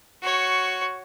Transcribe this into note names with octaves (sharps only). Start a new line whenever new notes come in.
F#4 C#5